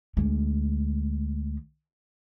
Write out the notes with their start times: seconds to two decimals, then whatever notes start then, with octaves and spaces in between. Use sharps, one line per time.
0.17 D2 G#3